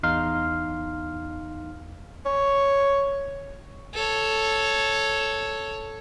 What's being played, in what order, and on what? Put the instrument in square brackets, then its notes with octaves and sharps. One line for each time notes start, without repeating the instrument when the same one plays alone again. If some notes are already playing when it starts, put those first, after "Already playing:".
[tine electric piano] E2 D#4 F5 C6 F6
[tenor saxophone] C#5
[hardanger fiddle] A4 C#5